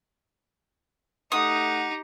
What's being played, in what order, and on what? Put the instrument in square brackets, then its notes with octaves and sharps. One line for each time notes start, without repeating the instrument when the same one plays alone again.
[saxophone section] A3 F#5 [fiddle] D#4 G4 [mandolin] D#6